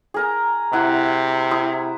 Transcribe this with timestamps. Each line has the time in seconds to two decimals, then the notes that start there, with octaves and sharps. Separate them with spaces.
0.14 G#4 A#4 A#5
0.73 C3 E4 F#5
1.51 E4 C6 D#6